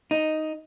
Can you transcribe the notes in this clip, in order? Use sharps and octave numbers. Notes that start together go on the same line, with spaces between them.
D#4